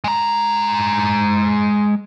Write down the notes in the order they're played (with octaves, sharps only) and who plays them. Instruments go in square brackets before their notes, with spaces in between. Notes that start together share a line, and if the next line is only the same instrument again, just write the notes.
[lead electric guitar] G#3 A#5